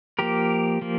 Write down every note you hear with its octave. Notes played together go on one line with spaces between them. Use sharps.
F3 A#3 G4 A#4
F3 A#3